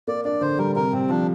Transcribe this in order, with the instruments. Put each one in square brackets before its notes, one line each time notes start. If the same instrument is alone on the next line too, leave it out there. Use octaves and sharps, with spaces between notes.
[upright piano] A#3 [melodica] D5
[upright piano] D4 [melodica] D5
[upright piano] D3 [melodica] C5
[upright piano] G3 [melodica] A#4
[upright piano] C3 [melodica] A#4
[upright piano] C3 [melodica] C4
[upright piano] F3 [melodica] D4